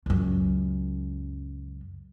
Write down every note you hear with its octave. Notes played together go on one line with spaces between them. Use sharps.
C#2 F#2